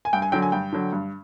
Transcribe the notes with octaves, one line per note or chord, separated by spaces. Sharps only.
G#5
G2 G5
G#5
D3 F#3 G5
G#5
G2 G5
D3 F#3
G2